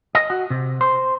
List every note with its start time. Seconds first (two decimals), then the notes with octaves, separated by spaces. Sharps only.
0.15 D#5
0.30 F#4
0.50 C3
0.81 C5